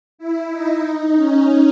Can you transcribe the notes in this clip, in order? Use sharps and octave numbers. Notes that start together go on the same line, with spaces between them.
E4
D#4
C#4